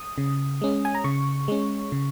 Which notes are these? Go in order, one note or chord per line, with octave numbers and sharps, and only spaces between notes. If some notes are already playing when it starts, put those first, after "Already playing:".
Already playing: D#6
C#3
G#3 C#4
G#5
A#5
C#3 C#6
G#3 C#4
C#3